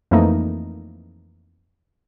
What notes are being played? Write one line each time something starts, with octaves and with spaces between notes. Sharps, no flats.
F2 E3 F3 A3 A#3 D#4